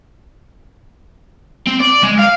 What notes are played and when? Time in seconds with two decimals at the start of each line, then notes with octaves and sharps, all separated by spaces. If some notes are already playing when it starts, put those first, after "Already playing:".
1.67 C4
1.80 D5
2.03 G#3
2.19 F5